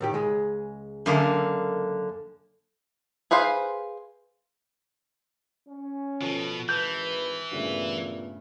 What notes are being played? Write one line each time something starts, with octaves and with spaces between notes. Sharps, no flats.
A2 D#3 G4
C#2 G#3 G#4
F#2 D3 A#3
G#4 B4 C5 F5
C#4
B2 F3 A4
G#1 E3 B4 A5 G6
G2 A#2 C#3 A3 B3